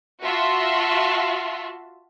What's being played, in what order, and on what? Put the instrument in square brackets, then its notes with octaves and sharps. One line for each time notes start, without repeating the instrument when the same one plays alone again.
[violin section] F4 F#4 E5 A5 C6